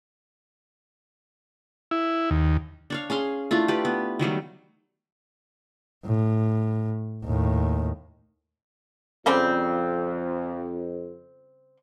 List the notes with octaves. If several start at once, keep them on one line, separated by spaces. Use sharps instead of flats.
E4
D#2
D4 C#5 F5
C#4 G#4 F5 C6
A3 D4 E4 F4
G4 B4 D5
B3
D#3 F#3 G3 A3
A2
D#2 A2
F2 C#3 G3 C4